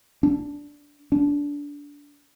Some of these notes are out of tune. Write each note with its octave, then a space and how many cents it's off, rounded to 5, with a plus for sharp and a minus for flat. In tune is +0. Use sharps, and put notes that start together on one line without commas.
D4 -10
D4 -20